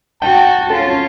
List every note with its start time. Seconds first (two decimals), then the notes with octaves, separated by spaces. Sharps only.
0.22 F#4 G5 A5
0.70 C#4 F4 A4